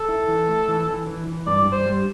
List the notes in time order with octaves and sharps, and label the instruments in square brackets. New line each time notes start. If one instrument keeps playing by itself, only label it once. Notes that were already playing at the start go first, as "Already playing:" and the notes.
Already playing: [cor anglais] A4
[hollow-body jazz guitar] E4
E3
A3
E3
E3
E3
E3
[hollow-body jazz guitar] G2 [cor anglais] D5
[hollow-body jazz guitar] G2
[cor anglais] C5
[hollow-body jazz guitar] G3